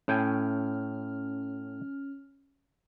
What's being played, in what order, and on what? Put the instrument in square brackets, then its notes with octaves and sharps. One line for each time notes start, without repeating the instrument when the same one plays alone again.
[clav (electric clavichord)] A2 G5 G#5 [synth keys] C#4 F6